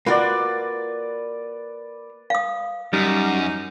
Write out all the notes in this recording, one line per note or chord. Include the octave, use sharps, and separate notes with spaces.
A#3 F4 F#4 B4 D5
F5 D#6
F#2 G3 D#4